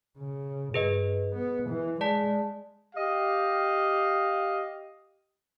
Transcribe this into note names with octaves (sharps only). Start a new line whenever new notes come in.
C#3
G2 G#4 B4 D#5
B3
E3
G#3 D5 A5 B6
G4 D#5 F5